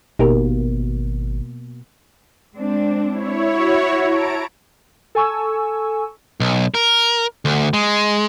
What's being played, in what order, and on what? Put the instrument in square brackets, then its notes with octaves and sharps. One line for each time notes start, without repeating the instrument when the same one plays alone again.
[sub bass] G#1 [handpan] B2 A#3 [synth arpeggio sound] D#4 G4 A#4
[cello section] G#3 C4 D4
[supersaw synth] E4 C#5
[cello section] F#4
[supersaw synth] A5 A#5 D7
[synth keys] A4 G#5 C#6 E6
[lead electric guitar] B1
A#4
D2
G#3